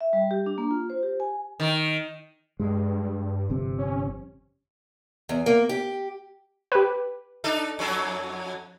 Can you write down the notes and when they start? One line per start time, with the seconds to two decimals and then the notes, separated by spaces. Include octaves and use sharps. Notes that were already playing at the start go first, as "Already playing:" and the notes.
0.01 E5
0.13 G3
0.31 G4
0.46 D4
0.58 A#3
0.71 F4
0.90 C5
1.03 G4
1.20 G#5
1.60 D#3
2.60 G2 G#3
3.50 G1 F2 C3
3.78 C#4
5.29 E2
5.46 A#3
5.69 G4
6.72 G4 B4
7.44 D4 D#4 A4
7.79 F2 F#3 A4